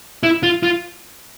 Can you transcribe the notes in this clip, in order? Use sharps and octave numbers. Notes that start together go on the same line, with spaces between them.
E4
F4
F4